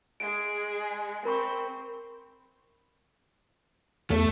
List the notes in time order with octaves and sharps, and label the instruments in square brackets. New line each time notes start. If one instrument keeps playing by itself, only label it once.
[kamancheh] G#3 G#4 [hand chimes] D7
[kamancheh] C4 [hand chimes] A#4 B5 C#6
[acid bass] E2 [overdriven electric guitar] A3